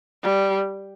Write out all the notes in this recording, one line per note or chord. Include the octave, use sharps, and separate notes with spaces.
G3